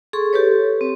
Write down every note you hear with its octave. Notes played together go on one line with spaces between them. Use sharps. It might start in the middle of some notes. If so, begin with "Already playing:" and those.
G#4 A4 C6 C#6
G4 A4 B4 C#5
C4